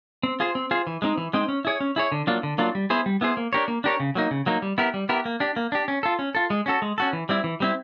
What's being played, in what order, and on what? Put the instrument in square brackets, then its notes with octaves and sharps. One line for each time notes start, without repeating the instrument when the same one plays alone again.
[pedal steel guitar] C4
F4 G#4 C5
C4
F4 G#4 C5
E3
G#3 C4 D#4
E3
G#3 C4 D#4
C#4
E4 G#4 C#5
C#4
E4 G#4 C#5
D3
F#3 A#3 D4 F4
D3
F#3 A#3 D4 F4
G3
B3 E4 G#4 C5
G3
B3 E4 G#4 C5
A#3
D4 G4 A#4 C#5
A#3
D4 G4 A#4 C#5
C#3
F#3 A#3 D#4
C#3
F#3 A#3 D#4
G3
B3 E4 G4 A#4
G3
B3 E4 G4 A#4
A#3
D4 G4
A#3
D4 G4
C#4
F4 A4
C#4
F4 A4
G#3
C#4 F#4 A4
G#3
C#4 F#4 A4
E3
G3 C4 E4
E3
G3 C4 E4